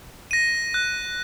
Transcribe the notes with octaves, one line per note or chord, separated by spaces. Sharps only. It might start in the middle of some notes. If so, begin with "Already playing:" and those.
A#6 D#7
F#6